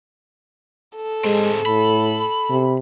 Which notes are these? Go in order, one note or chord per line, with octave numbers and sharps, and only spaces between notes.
A4
G#3 C4 G#4
A2 B5
C3